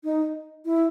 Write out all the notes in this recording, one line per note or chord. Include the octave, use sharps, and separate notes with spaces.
D#4
E4